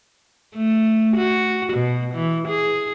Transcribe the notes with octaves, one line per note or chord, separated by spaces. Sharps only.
A3
F#4
B2
E3
G#4